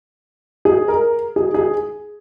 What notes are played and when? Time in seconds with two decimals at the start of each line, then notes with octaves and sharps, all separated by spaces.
0.65 G#4
0.88 A#4
1.36 G#4
1.54 G#4